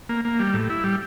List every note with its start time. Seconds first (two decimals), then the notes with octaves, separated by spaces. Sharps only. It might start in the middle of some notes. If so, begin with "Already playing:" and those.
0.09 A#3
0.25 A#3
0.39 G3
0.54 A2
0.70 E4
0.84 G3